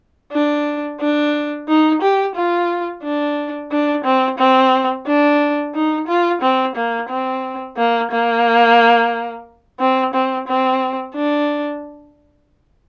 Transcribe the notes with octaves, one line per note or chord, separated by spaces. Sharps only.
D4
D4
D#4
G4
F4
D4
D4
C4
C4
D4
D#4
F4
C4
A#3
C4
A#3
A#3
C4
C4
C4
D4